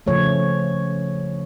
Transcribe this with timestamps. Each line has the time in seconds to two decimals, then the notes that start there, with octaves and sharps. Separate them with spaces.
0.07 C#3 F3 A3 C#5